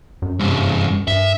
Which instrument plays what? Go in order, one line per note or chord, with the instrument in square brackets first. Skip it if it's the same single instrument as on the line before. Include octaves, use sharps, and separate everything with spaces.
[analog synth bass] F#2
[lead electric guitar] C2 G2
[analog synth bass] G2 [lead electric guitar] E5